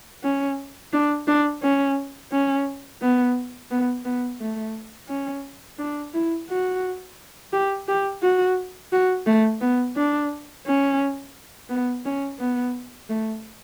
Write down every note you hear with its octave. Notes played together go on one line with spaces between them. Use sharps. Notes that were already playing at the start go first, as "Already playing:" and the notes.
C#4
D4
D4
C#4
C#4
B3
B3
B3
A3
C#4
D4
E4
F#4
G4
G4
F#4
F#4
A3
B3
D4
C#4
B3
C#4
B3
A3